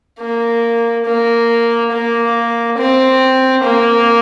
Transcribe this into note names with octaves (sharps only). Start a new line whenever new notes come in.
A#3
A#3
A#3
C4
A#3